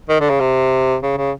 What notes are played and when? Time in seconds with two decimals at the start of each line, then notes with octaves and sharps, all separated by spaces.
0.09 D#3
0.20 D3
0.30 C#3
0.40 C3
1.03 C#3
1.17 C#3